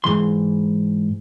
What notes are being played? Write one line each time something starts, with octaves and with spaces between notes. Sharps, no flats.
G#2 E3 C6